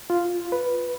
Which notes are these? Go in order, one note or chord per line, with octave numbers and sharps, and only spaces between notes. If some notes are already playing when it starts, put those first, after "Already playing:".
F4
B4